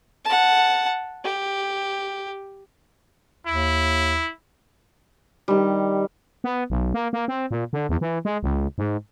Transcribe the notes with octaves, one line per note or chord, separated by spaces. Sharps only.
F#5 A5
G4
D#2 E4
D#3 G3
B3
B1
A#3
A#3
C4
A#2
D3
E2
E3
G#3
C#2
G#2